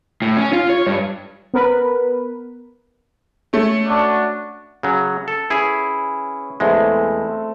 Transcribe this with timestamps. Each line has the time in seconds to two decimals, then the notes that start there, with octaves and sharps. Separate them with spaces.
0.22 A2
0.37 C#4
0.53 F4
0.70 C#5
0.87 G2
1.54 B3 A#4 B4
3.53 A3 C#4
3.86 D4 F#4
4.83 C#3 F#3 F#5
5.28 A4
5.50 C#4 E4 G#4 B4
6.60 E2 G#3 A3 C4